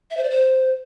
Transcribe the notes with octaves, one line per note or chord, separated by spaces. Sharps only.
E5
C5
D5
C5